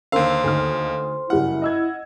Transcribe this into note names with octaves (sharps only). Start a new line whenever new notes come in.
D#2 D3 A#4 C5 F5 C6 E6
D2 D#4 F6
F#1 G3 E4 F#5 F6
D#5 E6 G#6